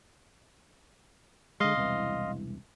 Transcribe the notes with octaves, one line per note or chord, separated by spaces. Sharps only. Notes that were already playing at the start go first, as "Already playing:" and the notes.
D3 G#3 D#5 F5 C6
E1 C2 E3